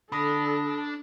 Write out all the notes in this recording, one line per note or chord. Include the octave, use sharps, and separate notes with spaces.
D3 D4 A4 A5 B5 D#6 A#6